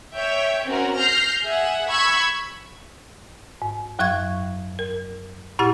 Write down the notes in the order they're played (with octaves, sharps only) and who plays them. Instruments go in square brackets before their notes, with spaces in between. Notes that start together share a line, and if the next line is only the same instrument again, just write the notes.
[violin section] C#5 E5 G5
C4 C#4 F#4 A#4
F6 G6 A#6 C7
G#4 E5 F#5
B5 C#6 E6 G#6 B6
[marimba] G#2
F#2 F#3 F5 C#6 G#6
A#4
A#2 E4 G4 F#5 F6 A6